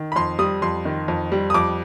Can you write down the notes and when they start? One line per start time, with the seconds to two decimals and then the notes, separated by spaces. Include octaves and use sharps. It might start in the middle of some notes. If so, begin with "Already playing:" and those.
Already playing: D#3
0.12 B5
0.16 F2 C6
0.39 G3 D#6
0.62 F2 C6
0.85 D#3
1.08 F2
1.32 G3
1.50 D#6
1.54 F2 D6